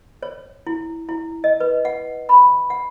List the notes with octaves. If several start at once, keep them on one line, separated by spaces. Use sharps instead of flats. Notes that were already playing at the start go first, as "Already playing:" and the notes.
C#5
E4
E4
D#5
B4
F#5
B5
F#5